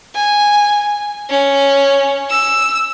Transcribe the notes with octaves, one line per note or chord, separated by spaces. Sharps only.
G#5
C#4
E6